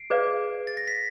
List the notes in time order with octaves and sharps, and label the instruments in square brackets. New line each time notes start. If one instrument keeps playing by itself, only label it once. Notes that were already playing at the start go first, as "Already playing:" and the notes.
Already playing: [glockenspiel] C7 D7
[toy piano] G#4 B4 D5 F5
[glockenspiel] A6
A#6
B6